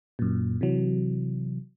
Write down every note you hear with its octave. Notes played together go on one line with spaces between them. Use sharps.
F#2 A#2
C3 E3 F#3